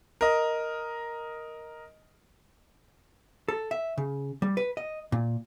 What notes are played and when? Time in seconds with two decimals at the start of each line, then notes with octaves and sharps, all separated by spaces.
0.21 A#4 D#5
3.48 A4
3.71 E5
3.98 C#3
4.42 G3
4.57 B4
4.77 D#5
5.12 A#2